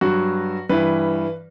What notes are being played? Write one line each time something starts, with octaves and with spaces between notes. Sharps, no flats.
G2 F#3 F#4
G2 E3 B4